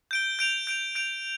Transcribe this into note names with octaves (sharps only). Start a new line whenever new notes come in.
G6 D7 G7
G6 D7 F7
G6 D7 F7
G6 D7 F7